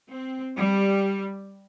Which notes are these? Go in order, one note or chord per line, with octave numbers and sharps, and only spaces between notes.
C4
G3